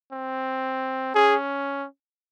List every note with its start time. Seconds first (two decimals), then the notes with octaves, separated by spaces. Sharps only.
0.13 C4
1.15 C#4 G#4